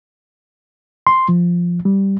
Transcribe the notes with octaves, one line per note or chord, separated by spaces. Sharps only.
C6
F3
G3